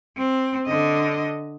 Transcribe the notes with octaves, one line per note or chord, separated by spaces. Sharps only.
C4
D3 D#5